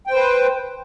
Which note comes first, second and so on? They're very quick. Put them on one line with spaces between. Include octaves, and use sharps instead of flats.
G5 C5 B4